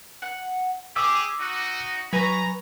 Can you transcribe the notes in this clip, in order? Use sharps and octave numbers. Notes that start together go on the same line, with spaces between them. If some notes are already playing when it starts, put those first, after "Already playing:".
F#5
G4 G#4 D6 E6
D#4 F#4
F#3 B4 G#5 A#5 C#6